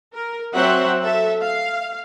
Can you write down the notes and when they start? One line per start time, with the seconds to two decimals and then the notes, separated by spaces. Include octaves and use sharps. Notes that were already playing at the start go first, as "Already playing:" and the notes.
0.11 A#4
0.53 F#3 C4 E5 F#5
1.03 A4 E5
1.41 F5